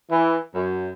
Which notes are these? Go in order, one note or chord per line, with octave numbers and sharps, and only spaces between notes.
E3
F#2